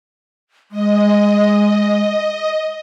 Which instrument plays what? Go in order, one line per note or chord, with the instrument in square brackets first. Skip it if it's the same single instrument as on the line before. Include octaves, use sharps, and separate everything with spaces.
[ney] G#3 [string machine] D#5